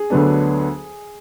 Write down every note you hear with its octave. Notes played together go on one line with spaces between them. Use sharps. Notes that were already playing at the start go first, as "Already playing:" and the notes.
Already playing: G#4 G#5
D2 D3 F#3 B3 D4